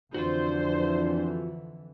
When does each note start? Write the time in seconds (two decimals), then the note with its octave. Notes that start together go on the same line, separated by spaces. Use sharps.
0.14 F2 D3 E3 D4 F4 F#4 C5